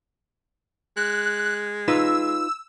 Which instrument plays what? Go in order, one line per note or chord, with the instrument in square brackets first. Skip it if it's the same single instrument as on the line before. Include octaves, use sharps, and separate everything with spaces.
[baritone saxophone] G#3 [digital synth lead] F#6
[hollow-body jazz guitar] D#4 F4 B4 [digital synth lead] E6